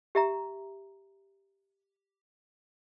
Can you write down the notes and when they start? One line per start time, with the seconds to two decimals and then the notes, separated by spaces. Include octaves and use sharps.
0.15 G4 E5 A#5